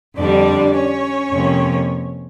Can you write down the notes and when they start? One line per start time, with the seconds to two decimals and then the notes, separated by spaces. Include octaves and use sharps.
0.16 F2 D3 G3 D4 D5
0.74 C#4 C#5
1.31 F2 C3 F3 A#3